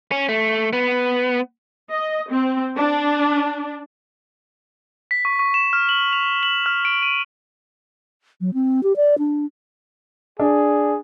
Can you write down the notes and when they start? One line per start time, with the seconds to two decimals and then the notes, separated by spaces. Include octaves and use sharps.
0.11 C#4
0.29 A3
0.73 B3
1.89 D#5
2.29 C4
2.77 D4
5.11 B6
5.25 C#6
5.39 C#6
5.54 E7
5.73 F6
5.89 F#7
6.13 F7
6.43 F#7
6.66 F6
6.85 D7
7.02 D#7
8.41 F#3
8.54 C4
8.83 G4
8.96 D5
9.18 D4
10.40 D4 G#4